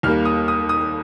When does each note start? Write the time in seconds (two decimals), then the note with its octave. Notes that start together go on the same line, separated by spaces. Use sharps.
0.03 D#2 D#3 G3 A#3 F6
0.25 D#6
0.48 D#6
0.69 D#6